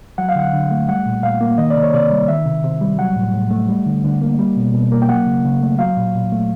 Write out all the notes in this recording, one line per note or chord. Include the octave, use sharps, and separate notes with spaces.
F#3 F#5
F5
D3 F#5
D3
A3
G3 F#5
A#2
A#2 F5
A#3
D#3 D#5
C3 D5
C#5
C3 D5
G3
D#3 E5
C3
C3
G3
F#3 F#5
A2
A2
A3
G3
D3
D3
A#3
G3
B2
B2
A#3
G5
F#3 F#5
C#3
C#3
A3
F#3 F5
A#2
A#2
A3